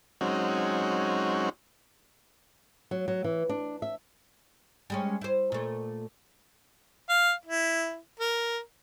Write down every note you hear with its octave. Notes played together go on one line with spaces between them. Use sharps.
F#3 G#3 C4 C#4 D#4 F#4
F#3
F#3
E3
D4
E5
G3 G#3 C#4
E4 C5
A#2 A3
F5
E4
A#4